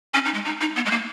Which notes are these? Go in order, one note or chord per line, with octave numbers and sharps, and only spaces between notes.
C#4
D#4
G#3
D#4
D#4
B3
G#3
A#3